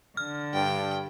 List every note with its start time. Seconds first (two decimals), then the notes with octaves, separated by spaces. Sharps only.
0.17 D3 F6
0.54 G2 G5